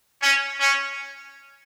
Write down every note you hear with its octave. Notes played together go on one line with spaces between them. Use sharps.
C#4
C#4